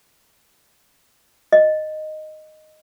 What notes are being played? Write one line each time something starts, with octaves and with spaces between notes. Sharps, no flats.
D#5